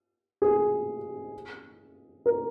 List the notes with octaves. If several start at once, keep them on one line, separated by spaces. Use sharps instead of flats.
G#4
A#4